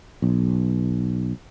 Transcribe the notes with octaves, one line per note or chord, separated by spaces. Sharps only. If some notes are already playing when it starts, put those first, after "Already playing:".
B1